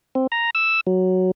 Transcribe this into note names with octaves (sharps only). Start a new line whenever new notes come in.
C4
A#5
E6
F#3